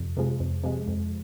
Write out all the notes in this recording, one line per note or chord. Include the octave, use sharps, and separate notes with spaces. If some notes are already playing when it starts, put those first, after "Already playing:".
Already playing: F2 C3
C3 F3 G#3
F2
C3 F3 G#3
F2